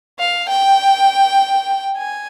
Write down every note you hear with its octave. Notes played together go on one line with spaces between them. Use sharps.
F5
G5
G#5